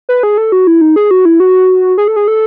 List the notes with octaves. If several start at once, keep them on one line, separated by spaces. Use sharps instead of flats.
B4
G#4
A4
F#4
E4
D#4
G#4
F#4
E4
F#4
G#4
A4
G#4
A4